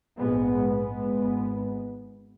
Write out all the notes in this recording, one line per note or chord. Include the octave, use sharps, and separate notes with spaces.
A#1 G#2 G#3 B3
G#3 B3
G#1 G#2